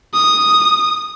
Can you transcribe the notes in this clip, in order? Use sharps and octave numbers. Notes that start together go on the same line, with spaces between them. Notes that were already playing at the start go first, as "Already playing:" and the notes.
D#6